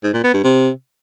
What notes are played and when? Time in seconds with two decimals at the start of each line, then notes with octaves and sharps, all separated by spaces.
0.04 G#2
0.14 A#2
0.24 B3
0.34 G2
0.44 C3